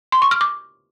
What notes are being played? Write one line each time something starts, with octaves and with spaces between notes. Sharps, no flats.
C6
C#6
F6
D6